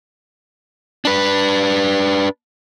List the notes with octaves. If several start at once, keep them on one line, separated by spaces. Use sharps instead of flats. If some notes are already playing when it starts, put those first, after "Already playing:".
D4 B4